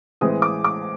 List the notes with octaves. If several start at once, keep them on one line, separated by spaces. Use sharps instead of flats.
A2 E3 G#3 C4 D#6
D6
D6